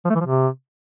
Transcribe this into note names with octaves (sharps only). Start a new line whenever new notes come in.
F3
A3
E3
F3
C3